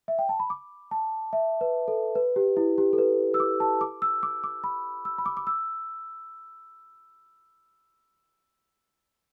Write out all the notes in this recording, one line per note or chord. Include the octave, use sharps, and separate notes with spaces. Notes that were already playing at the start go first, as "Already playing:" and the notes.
E5
G5
A5
B5
D6
A5
E5
B4
A4
B4
G4
E4
G4
A4
B4
E6
D6
A5
D6
E6
D6
D6
B5
E6
B5
D6
D6
E6